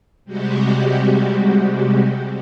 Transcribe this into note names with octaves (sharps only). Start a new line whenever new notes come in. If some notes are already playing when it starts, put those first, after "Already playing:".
C3 G3 G#3 F#4 G4